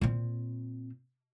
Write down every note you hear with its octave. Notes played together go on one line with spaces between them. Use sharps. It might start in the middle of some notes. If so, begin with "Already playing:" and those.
A#2 C4